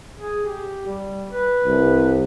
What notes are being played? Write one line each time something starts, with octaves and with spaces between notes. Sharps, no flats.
G#4
G4
G3
B4
C2